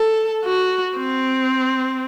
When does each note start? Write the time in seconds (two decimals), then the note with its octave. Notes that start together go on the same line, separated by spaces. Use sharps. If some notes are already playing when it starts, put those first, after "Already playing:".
Already playing: A4
0.45 F#4
0.97 C4